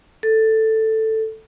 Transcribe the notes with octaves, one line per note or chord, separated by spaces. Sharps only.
A4